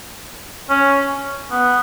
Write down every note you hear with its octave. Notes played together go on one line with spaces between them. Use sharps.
C#4
B3